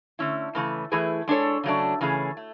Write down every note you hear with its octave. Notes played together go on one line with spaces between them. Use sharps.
D3 A3 C#4 E4
C#3 E3 A3
E3 A3 E4 G#4 B4
G#3 D4 A4 C#5
C#3 F#3 A3 D4
C#3 E3 A3 C#4 G#4
A3